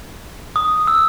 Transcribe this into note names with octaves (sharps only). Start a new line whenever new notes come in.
D#6
E6